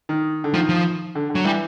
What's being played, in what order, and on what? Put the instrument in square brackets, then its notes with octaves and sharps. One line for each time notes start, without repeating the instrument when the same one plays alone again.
[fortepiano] D#3
D3
[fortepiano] D#3 [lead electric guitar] F3
[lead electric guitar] F3
[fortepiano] D3
D3
[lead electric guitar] F#3
[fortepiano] E3 [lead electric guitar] G3